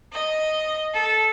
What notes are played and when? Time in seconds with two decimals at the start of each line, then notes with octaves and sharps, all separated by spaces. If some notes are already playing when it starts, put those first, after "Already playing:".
0.13 D#5
0.93 A4